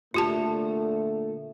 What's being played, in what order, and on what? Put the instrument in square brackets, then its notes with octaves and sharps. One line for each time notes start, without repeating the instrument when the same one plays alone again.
[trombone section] A#2 D3 A3 [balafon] F4 G4 A5